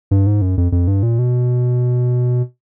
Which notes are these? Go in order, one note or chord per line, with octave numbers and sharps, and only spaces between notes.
G2
G#2
F#2
F2
F2
G2
A#2
B2